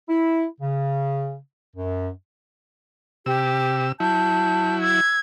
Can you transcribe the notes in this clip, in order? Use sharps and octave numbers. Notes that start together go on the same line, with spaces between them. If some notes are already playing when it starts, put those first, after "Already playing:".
E4
C#3
F#2
C3 G4 E6
F#3 E4 A5 G6
E6 G#6